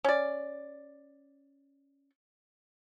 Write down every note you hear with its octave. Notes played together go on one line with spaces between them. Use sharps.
C#4 D5